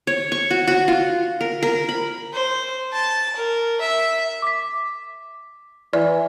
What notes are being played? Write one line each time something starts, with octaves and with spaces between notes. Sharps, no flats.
C#5
C#6
F#4
F#4
F4
A#4
A#4
B5
C5
A5
A#4
E5
D6 B6
E3 D5